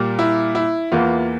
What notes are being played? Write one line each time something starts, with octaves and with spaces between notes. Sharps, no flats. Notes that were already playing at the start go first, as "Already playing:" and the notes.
Already playing: A#2 G3 A#3
E4
E4
E2 E3 A#3 F4